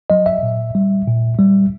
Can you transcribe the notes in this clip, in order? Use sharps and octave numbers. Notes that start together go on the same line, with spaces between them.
F#3 D#5
E5
A#2
G3
A#2
G3